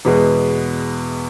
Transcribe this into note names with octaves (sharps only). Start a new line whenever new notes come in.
E2 B2 G#3 B3